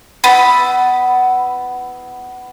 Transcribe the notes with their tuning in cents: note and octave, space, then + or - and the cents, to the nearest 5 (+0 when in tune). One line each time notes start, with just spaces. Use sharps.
B3 +15 E4 +0 B5 +0